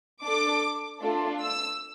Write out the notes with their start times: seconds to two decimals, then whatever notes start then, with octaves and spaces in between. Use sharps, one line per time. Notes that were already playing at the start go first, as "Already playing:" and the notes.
0.23 D4 A4 D6
1.01 A3 D4 F4 A4
1.41 E6